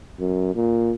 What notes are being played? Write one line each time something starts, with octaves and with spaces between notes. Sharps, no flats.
F#2
A#2